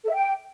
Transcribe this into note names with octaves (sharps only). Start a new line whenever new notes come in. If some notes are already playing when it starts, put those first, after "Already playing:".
A4
E5
G5